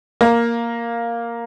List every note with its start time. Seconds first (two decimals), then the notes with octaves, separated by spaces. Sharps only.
0.21 A#3